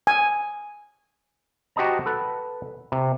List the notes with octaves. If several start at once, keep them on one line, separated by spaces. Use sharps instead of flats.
G#5
F#4 G4 C5 D#5 A5 A#5
A4 B4 F#5
C3